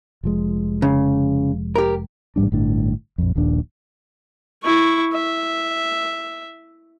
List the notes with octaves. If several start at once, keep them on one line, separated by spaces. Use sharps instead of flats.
F1 F3 G#3
C#3
G4 A#4
A1 G#2 G3 D4
G1 A2 D4
A#1 F2
D#1 A#1 D#2 D4
E4 C#6
E5